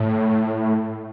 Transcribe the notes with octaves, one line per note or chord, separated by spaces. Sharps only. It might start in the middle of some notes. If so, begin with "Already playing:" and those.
Already playing: A2